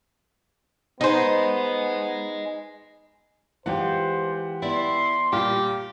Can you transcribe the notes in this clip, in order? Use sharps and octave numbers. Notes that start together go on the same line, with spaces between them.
B3 D#4 C5 D#5 G#5
E3 G#3 F4 G4 C5 F#5
B3 E4 D5 C6
A#2 G3 F4 G4